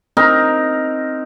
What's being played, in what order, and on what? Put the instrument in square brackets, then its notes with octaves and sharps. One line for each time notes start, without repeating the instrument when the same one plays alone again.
[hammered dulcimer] C4 D#4 A#4